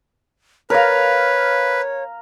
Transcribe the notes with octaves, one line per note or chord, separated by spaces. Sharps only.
A#4 B4 C#5 F5